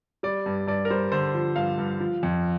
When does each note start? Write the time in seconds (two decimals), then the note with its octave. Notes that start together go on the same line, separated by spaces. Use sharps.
0.23 G3 D5
0.46 G2
0.67 G2 D5
0.85 A#4
0.90 G3 C5
1.12 D3 C5
1.34 F3
1.56 G2 F5
1.78 G2
2.00 F3
2.23 F2